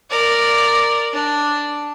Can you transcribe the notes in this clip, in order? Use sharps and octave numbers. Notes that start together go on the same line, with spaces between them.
A#4 D5
D4